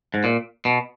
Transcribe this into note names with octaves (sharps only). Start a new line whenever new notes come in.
G#2
A#2
B2